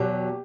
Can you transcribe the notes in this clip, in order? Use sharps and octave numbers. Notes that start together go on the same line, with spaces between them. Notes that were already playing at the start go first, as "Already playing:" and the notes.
Already playing: E2 B2 F#3 G4